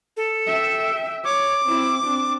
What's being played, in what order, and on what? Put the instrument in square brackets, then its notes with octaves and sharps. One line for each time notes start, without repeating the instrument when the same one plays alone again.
[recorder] A4
[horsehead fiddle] E5 G5
[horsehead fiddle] C#5 [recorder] D6
[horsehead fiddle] C4 E4
C4 D4